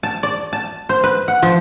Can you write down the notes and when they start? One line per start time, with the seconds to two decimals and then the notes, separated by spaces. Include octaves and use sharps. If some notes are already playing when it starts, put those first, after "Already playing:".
0.03 A5
0.23 D5
0.53 A5
0.89 C5
1.04 B4
1.28 F#5
1.43 F3